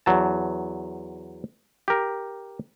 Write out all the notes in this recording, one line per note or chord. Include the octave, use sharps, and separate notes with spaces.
E2 F#3 A5
G4 A#4